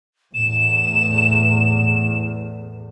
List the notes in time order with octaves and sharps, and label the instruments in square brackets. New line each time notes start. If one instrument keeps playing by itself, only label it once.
[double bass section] E2 A2 [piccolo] E7